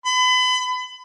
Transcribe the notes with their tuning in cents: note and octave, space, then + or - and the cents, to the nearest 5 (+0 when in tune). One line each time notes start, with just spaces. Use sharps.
B5 +35